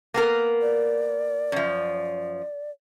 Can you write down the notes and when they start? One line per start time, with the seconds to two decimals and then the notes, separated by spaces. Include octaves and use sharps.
0.14 A#3 B3 A#4
0.62 D5
1.52 F#2 F3